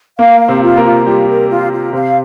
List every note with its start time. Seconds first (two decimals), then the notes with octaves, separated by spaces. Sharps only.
0.18 A#3 F5
0.40 F5
0.48 C3 C4
0.63 F4
0.77 A#3 A#4
0.84 F4
1.06 G3 F4 G4
1.28 A#4
1.49 F4
1.72 F4
1.93 C3 C4 F5